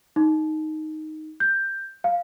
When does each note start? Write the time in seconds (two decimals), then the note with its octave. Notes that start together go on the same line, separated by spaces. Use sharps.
0.16 D#4
1.40 G6
2.04 F5